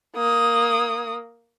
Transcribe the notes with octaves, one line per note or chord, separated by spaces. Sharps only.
A#3 D#6